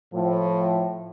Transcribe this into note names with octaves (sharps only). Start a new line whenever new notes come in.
A2 F3